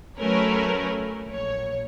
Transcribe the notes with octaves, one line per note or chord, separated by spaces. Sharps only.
F#3 A3 C#4 A#4 B4 C#5
A#1 C#5